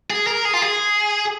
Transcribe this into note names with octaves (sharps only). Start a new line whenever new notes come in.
G#4
A#4
G#4
F4
G#4